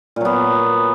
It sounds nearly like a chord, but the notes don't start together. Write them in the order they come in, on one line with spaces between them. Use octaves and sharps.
A#2 F#3 B3